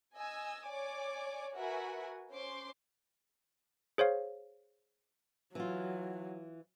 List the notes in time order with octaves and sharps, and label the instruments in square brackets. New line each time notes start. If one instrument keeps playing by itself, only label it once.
[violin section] D#5 G#5 E6
C#5 D5 G#5 D6
F#4 A#4 B4 E5 F#5 G#5
C#4 C5 C6 D6
[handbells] G#4 C5 C#5 F5
[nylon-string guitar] E3 F4 [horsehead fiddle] F#3